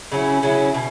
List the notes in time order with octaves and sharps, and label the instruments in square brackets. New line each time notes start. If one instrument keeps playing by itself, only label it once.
[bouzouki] C#3 F#3 C#4 E4
C#3 F#3 C#4 E4
B2